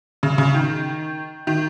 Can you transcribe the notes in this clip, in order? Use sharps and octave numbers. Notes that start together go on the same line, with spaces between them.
C#3
C#3
D#3
D#3